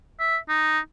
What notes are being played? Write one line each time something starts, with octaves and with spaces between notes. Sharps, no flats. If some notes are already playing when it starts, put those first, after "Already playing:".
E5
D#4